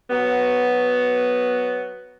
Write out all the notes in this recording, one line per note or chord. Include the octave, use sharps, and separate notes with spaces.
F#3 B3 F#4